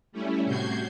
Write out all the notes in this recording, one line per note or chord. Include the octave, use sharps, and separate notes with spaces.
G3 A3 C#4 E4
A2 C3 F#4 G6 G#6 C7